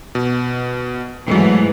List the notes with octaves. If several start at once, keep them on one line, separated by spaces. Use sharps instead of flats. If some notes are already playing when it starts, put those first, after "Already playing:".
B2
G#2 E3 F#3 A3